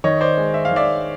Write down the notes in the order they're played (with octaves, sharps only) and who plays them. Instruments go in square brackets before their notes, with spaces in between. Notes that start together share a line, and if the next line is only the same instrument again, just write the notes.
[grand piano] D#3 C#5 D#5
C5 D5
G#3
E5
F5
D#3
D5 E5